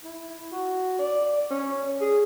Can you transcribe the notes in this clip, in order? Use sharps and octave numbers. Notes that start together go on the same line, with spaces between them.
E4
F#4
D5
C#4
G#4